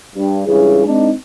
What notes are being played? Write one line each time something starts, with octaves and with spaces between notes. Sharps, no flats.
G2
C#2 G2 C#3 E3 E4 G#4
G#3 C4 D4 D#4